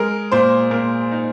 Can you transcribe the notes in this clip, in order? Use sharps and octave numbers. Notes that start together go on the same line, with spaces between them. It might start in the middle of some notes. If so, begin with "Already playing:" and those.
Already playing: G#3 A#4
A#2 C5
A#2 A#4
D#4